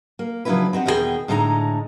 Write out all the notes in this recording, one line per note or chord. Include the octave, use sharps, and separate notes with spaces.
A#3
C#3 F3 F#3 D4 E4 B4
C4 D#4 G4 F#5
E2 B2 D#3 F4 G#4 G5
A2 D3 G#3 D#4 D#5 A#5